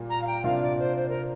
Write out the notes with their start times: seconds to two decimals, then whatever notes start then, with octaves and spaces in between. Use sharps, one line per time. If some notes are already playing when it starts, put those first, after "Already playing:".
Already playing: A#2 G3 A#3 F4
0.09 A#5
0.21 F5
0.26 G5
0.44 C3 A#3 D4 F4 F5
0.61 D5
0.78 C5
0.96 C5
1.08 A#4